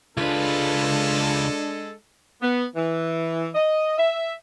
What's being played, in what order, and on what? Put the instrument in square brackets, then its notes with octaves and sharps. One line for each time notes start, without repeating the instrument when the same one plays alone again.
[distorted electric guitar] C#2 B4 [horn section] G#3 A4 [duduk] D4 [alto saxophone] F4
[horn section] B3
E3
D#5
E5